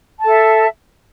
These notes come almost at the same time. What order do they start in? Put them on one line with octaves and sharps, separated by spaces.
A5 A4 E5